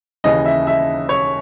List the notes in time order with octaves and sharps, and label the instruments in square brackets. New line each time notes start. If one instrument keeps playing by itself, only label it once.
[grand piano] D#2 C#3 E3 D#5
E5
E5
C#5